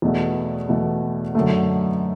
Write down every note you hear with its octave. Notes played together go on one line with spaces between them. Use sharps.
E2 B2 A3
E2 B2 A3
F#2 D3 A3